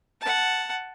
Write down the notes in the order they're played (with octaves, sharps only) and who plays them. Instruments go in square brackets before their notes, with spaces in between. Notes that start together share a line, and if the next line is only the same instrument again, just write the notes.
[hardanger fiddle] F#5 A5